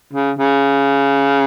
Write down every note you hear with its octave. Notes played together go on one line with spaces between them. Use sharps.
C#3
C#3